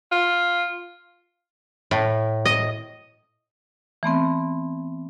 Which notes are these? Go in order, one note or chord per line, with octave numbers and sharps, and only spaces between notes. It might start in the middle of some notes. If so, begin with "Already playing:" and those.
F4
A2
D#5
E3 A3 B3 C4